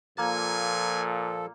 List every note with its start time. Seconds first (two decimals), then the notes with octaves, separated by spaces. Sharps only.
0.18 A#2 F3 A#3 A4 G#5